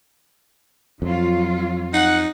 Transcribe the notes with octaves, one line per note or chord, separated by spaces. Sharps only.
F2 F#3 F4
D#4 F#5